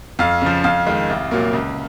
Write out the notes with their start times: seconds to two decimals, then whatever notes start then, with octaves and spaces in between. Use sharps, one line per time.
0.19 F2 F5
0.42 C#3 F3
0.64 F2 F5
0.87 D#3 G#3
1.10 C2
1.31 A#2 F#3 A#3
1.53 C#2